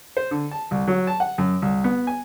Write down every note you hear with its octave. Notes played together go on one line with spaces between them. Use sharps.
C5
D3
A5
C2
F#3
A5
F#5
F#2
C2
B3
G#5